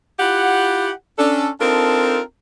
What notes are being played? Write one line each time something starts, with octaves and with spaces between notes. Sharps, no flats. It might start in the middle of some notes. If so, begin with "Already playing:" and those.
E4 F4 G4 F#5
C#4 D4 A4
C4 D4 D#4 F4 A4 A#4